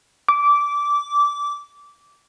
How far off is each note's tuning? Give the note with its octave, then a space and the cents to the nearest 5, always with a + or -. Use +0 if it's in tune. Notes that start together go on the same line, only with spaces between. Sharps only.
D6 -15